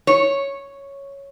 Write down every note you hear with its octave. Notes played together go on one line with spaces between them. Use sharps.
C#5